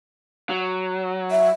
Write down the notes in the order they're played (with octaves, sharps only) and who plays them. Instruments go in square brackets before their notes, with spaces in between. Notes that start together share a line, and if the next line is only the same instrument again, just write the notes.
[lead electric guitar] F#3
[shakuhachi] E5